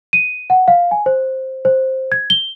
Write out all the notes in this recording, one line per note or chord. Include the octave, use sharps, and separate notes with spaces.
D#7
F#5
F5
G#5
C5
C5
G#6
G7